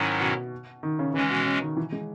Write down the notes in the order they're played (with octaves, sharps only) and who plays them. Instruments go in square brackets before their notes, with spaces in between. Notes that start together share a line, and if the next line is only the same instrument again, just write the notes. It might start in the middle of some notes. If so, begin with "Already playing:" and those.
Already playing: [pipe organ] G#2 D#3 F#3 C#4 E4
[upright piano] B2
D#3
C#3
[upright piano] C#3 [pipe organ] E3 G#3 C#4
[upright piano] B2
C#3
D#3
E3
G#3